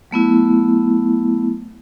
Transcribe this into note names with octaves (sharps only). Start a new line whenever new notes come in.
F#3 A3 B3 E4